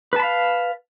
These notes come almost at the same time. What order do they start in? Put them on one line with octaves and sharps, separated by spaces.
B4 A5 B5 F5